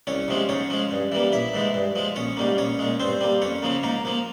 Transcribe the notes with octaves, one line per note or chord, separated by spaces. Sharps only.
C2 C#4 C#5
C3 F3 G#3
G#2 C#4 C#5
F3 G#3
G2
E3 G3 A#3
A#1 E4 E5
G#2 E3 G#3
G2
F3 G#3
A#1 C#4 C#5
G#2 G3 A#3
A#1 C#4 C#5
A#2 G#3
G2 C4 C5
G3 A#3
F2 C#4 C#5
C#3 F3 A#3
G#2 A#3 A#4
F3 A#3